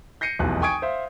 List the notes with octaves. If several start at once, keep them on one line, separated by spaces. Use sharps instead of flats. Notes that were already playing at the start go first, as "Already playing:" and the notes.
G6 A#6 C7 C#7 D#7
F1 B1 E2 F#6
G5 G#5 C#6 D#6 G#6 D7
C5 E5 F5